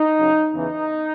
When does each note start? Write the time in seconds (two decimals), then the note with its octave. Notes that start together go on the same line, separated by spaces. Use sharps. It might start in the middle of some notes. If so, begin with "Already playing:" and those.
Already playing: D#4
0.18 F#2 C#3 F#3
0.54 E2 C#3 E3 D#4